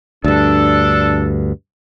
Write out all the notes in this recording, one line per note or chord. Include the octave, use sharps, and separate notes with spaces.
D2 G2 D4 A4